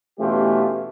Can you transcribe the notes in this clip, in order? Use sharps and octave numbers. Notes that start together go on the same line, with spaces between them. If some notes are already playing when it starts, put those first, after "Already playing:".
B2 E3 A3 C#4 F4 G4